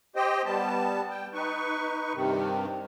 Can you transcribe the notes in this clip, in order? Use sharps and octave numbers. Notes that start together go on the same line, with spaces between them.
G4 C5 D#5 G5
G3 B3 A5
G5
D#4 B4 C#6
G2 C3 D#3